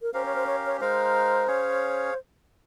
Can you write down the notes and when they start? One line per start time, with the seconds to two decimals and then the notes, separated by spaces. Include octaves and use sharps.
0.02 A#4
0.14 C#4 G4 A#4 C5 F5
0.25 C#5
0.36 C5
0.47 C#5
0.66 C#5
0.80 G#3 D#4 A#4 C5 F5
1.47 C#4 G#4 C#5 F5